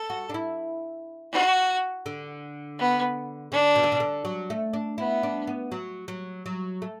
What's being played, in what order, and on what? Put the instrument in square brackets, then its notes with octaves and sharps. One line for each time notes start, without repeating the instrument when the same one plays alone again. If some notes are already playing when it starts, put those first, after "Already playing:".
Already playing: [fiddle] A4
[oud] F#4
D4
E4
[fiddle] F#4
[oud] D3
[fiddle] B3
[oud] D3 [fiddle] D4
[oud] B2
D3
B2
D3
F#3
A3
D4
[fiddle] B3 [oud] E4
[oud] D4
B3
F#3
F#3
F#3
A3